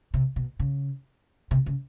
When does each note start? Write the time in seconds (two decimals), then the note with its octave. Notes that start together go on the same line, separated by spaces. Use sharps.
0.14 C3
0.36 B2
0.59 C#3
1.51 C3
1.66 C#3